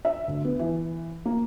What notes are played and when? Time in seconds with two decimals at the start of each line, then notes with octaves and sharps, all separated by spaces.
0.05 E5
0.28 D2
0.45 B3
0.59 E3
1.25 A#3